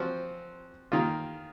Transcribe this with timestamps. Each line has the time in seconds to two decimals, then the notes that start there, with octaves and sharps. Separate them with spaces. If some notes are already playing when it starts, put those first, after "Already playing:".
Already playing: F3 C4 F#4
0.92 D#3 A#3 F4